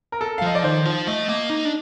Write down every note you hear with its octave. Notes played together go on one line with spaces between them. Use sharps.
A#4
A4
F5
F3 D#5
D5
D#3 C5
F3
A3 D#5
A#3
D#4
D4